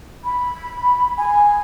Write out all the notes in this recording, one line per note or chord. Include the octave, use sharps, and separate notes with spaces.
B5
G#5